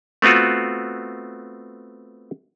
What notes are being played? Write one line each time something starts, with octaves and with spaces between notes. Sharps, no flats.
A3 B3 C4 F4 F#4